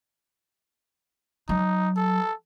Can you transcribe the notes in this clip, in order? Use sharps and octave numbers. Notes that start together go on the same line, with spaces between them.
F#3 D#4
A4